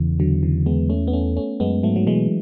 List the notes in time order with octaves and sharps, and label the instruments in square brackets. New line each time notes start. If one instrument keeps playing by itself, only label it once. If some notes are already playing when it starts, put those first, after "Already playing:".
Already playing: [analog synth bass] E2 [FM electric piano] C#3 E3
[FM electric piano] D3 F#3
C#3 E3
G#3 B3
A3 C#4
B3
A3 C#4
A3 C#4
[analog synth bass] F#2 [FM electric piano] G#3 B3
[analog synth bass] G#2 [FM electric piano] F#3 A3
[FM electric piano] F#3
[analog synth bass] B2 [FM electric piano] E3 G#3